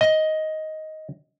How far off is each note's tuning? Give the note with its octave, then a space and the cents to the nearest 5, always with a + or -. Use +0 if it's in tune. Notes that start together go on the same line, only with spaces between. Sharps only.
D#5 +10